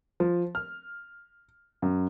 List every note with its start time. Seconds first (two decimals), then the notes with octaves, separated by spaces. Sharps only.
0.20 F3
0.55 F6
1.82 F#2